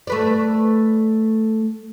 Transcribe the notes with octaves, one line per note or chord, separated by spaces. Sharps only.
A3 B4 D5